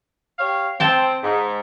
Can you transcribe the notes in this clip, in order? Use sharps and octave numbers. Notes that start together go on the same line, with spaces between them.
G4 C#5 F5
C4 G5 A5
G#2